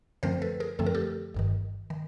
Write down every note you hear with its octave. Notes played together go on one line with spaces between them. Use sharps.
F#2 D3 F3 A3 C4 A#4 C5
A4 B4
G#4 A#4
F#2 D3 F3 A3 C4 A4
A#4
G4 A4
G1 G2 D#3
D#3